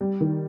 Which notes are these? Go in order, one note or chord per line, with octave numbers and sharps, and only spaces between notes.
G3
D#3